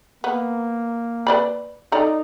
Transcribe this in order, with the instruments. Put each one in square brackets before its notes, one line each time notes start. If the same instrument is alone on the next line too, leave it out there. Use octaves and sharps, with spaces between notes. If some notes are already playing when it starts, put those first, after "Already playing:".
[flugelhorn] A#3 [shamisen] B3
[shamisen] B4 D5 B5
[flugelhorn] D#4 [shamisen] A4 D5 A#5